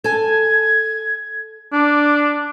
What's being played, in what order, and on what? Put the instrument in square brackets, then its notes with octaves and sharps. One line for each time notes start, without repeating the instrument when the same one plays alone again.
[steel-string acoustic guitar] A4 G#5 [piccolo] G#6
[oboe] D4 [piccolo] D6